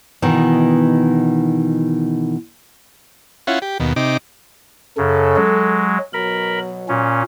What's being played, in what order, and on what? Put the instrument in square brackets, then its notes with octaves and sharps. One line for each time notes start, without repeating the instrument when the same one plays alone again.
[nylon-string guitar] B2 D#3 E3
[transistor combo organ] C#4 E4 F4 F#5
G4
D#2 B2
C3 D#4 D6
[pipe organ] F#2 C#3 [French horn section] A4
[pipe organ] F#3 G#3
[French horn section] B2 F#3 [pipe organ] A#4 B5
[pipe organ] A#2 C#4